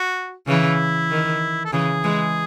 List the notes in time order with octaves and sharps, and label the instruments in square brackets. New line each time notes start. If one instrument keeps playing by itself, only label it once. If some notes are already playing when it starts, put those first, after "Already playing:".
Already playing: [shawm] F#4
[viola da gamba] C#3 E3 [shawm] E4
[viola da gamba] D#3
[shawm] A4
[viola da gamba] C#3 E3 [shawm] G#4
[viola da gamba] E3 G#3